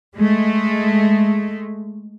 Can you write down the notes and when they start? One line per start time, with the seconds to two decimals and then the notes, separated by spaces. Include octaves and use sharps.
0.17 G#3 A3